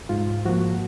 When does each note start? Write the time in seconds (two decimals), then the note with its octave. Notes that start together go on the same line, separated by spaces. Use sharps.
0.09 G#2 F4
0.45 F3 A#3 F#4